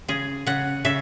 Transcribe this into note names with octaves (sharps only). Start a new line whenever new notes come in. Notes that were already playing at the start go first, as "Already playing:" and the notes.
C#3 G#4
C#3 F#5
C#3 E5